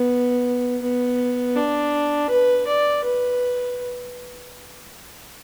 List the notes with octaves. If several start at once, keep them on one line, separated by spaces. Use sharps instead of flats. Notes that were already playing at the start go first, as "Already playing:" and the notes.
Already playing: B3
B3
D4
B4
D5
B4